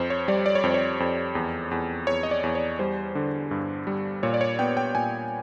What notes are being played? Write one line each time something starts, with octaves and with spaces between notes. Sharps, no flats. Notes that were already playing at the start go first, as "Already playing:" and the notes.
Already playing: F2 C5
C#5
G3 D5
D5
C#5
F2 C5
C#5
F2
E2
E2
E2 C#5
D#5
D5
E2
C#5
G3 C5
D3
G2
G3
A#2 C#5
D5
C#5
B3 G5
G5
A#2 G#5